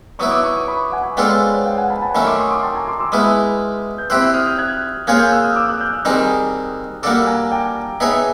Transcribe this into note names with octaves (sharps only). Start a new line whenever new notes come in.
F#3 B3 E4 C#6 D#6
D6 E6
C#6 D#6
C#6 D#6
B5 C#6
F#5 G#5
G#3 B3 D4 F4 A4 F5 G5
C#5
C5
C#5
F5 G5
F#5 G#5
A5 B5
A5 B5
D#3 F#3 A3 C#4 B5 C#6
C6 D6
C#6 D#6
C6 D6
G5 A5
G#5 A#5
C6 D6
D6 E6
G#3 B3 E4 D#6 F6
G6
C4 E4 G4 C5 E6 F#6
D#6 F6
F6 G6
F#6 G#6
A#3 C#4 F4 G#4 C#5 F#6 G#6
F6 G6
E6 F#6
D#6 F6
D6 E6
E6 F#6
F6 G6
E6 F#6
D#3 G3 C4 D#4 G#4 D#6 F6
G3 A#3 D4 F#4 A4 D6 E6
G#5 A#5
G5 A5
B3 D#4 G#4 C#5 E5